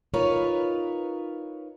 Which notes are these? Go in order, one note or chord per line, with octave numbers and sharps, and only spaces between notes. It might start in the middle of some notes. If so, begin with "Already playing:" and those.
D#4 F4 A#4 B4 C#5